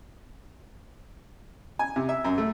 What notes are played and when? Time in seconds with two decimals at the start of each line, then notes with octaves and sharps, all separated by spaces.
1.79 G#5
1.96 C3
2.09 E5
2.25 F#2
2.38 A3